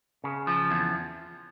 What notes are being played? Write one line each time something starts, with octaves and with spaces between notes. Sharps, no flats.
C#3
F3
E2